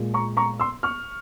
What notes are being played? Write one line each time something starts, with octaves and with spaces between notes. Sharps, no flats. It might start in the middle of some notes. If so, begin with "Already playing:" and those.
Already playing: A#2 G#3
A#5 C#6
A#5 C#6
C6 E6
C#6 F6